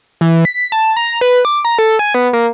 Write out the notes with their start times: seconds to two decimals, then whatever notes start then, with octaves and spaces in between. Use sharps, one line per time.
0.21 E3
0.45 B6
0.72 A5
0.97 A#5
1.21 B4
1.45 D6
1.65 A#5
1.79 A4
1.99 G#5
2.14 B3
2.33 A#3